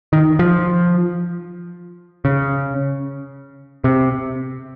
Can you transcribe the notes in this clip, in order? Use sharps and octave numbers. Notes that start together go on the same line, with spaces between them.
D#3
F3
C#3
C3